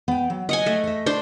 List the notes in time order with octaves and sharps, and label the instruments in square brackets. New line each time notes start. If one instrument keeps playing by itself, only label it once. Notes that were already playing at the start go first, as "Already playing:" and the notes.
[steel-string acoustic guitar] B3 G5
F#3
[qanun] D#5 F#5 G#5
A3
[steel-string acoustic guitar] D#5 E5
[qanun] D4 C5